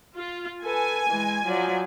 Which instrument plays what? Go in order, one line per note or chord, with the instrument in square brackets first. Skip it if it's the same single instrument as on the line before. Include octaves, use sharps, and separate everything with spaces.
[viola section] F4
[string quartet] A4 B4 [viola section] G#5
[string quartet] E3 G#3
F3 F#3 D5